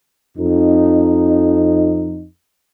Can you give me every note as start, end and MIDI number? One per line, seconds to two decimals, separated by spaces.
0.38 2.25 41
0.38 2.25 63